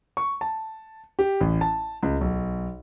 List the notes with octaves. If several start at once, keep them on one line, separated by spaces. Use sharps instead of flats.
C#6
A5
G4
A1
A5
C#2
B1